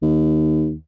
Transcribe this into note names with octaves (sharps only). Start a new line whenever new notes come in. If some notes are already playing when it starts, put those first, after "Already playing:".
D#2